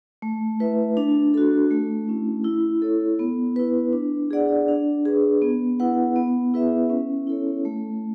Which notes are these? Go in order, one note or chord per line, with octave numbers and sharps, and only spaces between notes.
A3
E4 B4 E5
D4
F#4 A4
A3
C#4 E4
E4
A4 C#5
B3
E4 B4
D4
G#4 D5 F#5
D4
G#4 B4
B3
E4 B4 F#5
B3
E4 G#4 B4 E5
C#4
E4 A4 C#5
A3